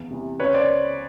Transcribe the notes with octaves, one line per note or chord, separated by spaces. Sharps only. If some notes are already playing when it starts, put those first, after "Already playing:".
Already playing: E2
C3 E3
C#2 B4 C#5
C5 D5